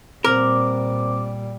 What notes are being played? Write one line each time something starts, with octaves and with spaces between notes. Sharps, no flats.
A#2 G3 C4 A#4 C5 D6